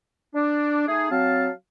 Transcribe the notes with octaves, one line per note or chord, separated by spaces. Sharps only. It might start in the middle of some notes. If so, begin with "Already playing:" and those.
D4
A3 D#4 G#4
F#3 C4 F5 A5